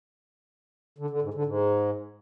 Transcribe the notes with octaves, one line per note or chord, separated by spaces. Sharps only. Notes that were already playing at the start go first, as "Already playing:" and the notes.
D3
D3
G#2
D3
G#2